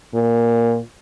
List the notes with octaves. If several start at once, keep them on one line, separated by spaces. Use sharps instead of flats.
A#2